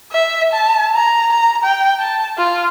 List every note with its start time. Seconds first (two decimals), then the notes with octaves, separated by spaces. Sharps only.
0.12 E5
0.53 A5
0.95 A#5
1.32 A#5
1.64 G5
2.00 A5
2.38 F4